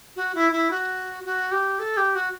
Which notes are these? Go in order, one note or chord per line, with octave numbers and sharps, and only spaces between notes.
F#4
E4
E4
F#4
F#4
G4
A4
G4
F#4